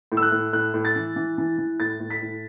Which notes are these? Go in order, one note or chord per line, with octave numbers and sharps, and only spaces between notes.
A2
E6
F#6
A2
A2 F#6
A2
A6
E3
E3
E3
E3
A2 A6
A2
B6
A2